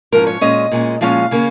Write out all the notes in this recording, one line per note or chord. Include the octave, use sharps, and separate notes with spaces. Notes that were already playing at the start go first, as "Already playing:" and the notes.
G#2 F3 C#4 A#4
C#5
A#2 G#3 C#4 D#5
A#2 G#3 C#4
A#2 F3 G#3 C#4 F5
C#3 A#3 C#4